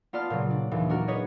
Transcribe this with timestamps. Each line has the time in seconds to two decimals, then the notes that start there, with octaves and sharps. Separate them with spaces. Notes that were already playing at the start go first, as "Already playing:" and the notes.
0.13 B3 F4 D5 A5 F6
0.30 A#2 C#3 F#3
0.50 D4
0.71 D#2 A#2 E3
0.89 D4 F#4 A#4
1.08 G#4 B4 C#5 D#5